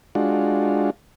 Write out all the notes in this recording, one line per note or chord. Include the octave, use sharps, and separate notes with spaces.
G#3 D4 F4 F#4